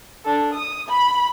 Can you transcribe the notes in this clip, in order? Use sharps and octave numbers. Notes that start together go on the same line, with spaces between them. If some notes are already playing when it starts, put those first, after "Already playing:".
D4 A4
D#6
B5